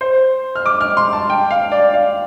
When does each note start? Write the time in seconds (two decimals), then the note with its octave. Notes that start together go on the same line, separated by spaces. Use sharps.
0.01 C5
0.55 F6
0.66 D6
0.81 F6
0.97 C6
1.13 A5
1.30 G5
1.51 F5
1.72 D5
1.94 F5